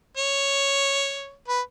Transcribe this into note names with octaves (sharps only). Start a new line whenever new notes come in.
C#5
B4